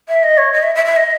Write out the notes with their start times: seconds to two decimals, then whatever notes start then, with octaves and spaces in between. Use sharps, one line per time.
0.08 E5
0.23 D#5
0.37 C#5
0.52 D#5
0.63 E5
0.75 E5
0.85 E5
0.96 D#5